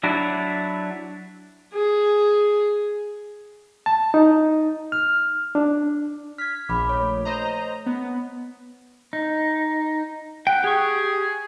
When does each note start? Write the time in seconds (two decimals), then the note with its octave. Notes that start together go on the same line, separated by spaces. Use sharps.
0.03 F#3 D4 E4 F#4 D5
1.73 G#4
3.86 A5
4.14 D#4
4.92 F6
5.55 D4
6.38 F6 G#6 B6
6.69 A#1 B5 D6
6.89 A3 C#5
7.25 C5 D#5 A#5
7.86 B3
9.13 D#4
10.47 F#5 G5
10.64 G4 G#4 C#6